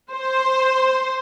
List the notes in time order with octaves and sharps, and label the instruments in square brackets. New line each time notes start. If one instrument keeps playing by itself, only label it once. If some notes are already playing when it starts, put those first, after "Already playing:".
[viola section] C5